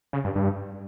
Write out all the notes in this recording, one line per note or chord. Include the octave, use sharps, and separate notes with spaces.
C#3
G2
G2